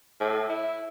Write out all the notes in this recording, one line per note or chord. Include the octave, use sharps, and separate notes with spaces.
A2
E4